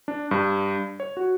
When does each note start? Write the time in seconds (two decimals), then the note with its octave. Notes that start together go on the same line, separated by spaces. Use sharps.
0.08 D4
0.31 G2
1.00 C#5
1.17 F#4